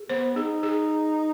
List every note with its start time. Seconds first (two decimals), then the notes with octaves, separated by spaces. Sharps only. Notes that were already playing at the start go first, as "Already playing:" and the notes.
Already playing: G#4
0.10 B3 C5
0.36 D#4 G#4
0.63 G#4